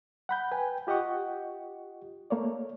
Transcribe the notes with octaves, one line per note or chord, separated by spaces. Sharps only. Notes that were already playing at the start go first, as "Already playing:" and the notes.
F#5 B5 G6
B4 G5 G#5
F4 G4 D#5 F#5 C#6
A3 A#3 C#5 D5